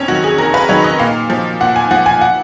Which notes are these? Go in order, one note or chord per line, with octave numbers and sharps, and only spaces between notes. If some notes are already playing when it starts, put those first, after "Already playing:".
Already playing: F2 C#4
D#3 F#3 F#4
G#4
F2 A#4
B4
D#3 F#3 C#5
D#5
A#2 F5
F3
A#2 F#5
G#5
F3 F#5
G#5
F#5